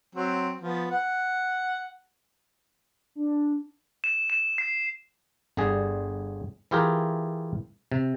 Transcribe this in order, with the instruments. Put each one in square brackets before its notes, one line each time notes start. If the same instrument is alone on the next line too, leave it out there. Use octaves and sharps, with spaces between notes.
[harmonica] F#3 C4
F3 B3
F#5
[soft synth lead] D4
[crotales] E7
E7
C7
[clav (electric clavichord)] G1 D3 G3 G#4
E3 E4 F4 G4 G#4 A#4
C3